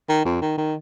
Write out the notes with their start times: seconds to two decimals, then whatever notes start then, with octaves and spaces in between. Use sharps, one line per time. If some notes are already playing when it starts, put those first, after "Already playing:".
0.09 D#3
0.25 F2
0.42 D#3
0.58 D#3